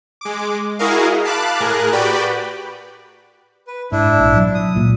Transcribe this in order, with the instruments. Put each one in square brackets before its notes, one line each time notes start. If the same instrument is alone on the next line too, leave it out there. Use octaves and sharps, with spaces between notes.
[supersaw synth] G#3 D6
E4 F#4 G#4 A#4 D#5 F5
F5 A5 B5 D6 F#6
A2 G#4 A#4 F#6
F#4 G4 B4 D5 G5 B5
[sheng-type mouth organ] B4
[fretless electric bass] G#2 [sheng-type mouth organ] D4 E4
[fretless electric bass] A#1
B2 F#3
[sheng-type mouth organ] D#6
[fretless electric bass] C#2 A#2 A#3